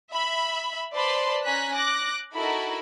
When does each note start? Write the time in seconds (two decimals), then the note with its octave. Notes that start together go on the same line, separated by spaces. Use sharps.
0.12 E5 B5
0.92 B4 C5 D5 A5 B5 C6
1.45 C#4 G#5 A#5 F#6 B6
1.74 D6 F#6 A#6
2.33 D#4 E4 F#4 A4 A#4 B5